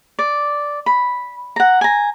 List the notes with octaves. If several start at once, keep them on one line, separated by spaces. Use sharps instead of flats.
D5
B5
F#5 A#5
G#5 A#5